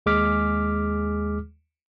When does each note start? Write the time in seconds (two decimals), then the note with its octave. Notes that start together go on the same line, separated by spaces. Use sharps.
0.06 D#2 G#3 G#4 D6 F6 B6